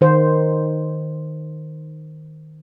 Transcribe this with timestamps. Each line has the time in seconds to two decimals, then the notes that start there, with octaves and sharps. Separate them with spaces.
0.01 D#3 C5